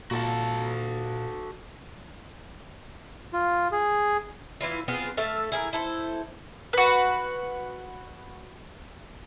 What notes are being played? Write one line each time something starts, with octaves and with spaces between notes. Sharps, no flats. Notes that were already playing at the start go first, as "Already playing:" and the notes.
A#2 F#4 A4 F5 A5
F4
G#4
E3 E4 F4
B3 C4 F4 G#4
A3 A4 E5 F5
E4 G#4 A#4
E4 A4 C5
F#4 B4